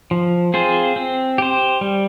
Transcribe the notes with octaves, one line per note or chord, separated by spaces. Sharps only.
F3
C4 F4 G#4 C5
C4
G4 C5
G3